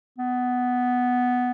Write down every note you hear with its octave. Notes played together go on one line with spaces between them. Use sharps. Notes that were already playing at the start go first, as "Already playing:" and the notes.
B3